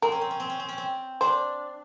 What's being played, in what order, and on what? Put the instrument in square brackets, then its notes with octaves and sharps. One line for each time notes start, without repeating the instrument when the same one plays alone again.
[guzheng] C4 [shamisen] A#4
[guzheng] C#4
C4
C#4
C4
C#4
C4
C#4
C4
[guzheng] D4 [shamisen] C5